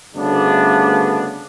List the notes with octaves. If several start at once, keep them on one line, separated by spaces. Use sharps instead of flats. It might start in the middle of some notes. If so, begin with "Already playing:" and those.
D2 G2 C#3 A3 B3 D4